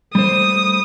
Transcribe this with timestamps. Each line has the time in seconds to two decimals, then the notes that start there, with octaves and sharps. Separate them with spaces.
0.15 G3 A3 C5 D#6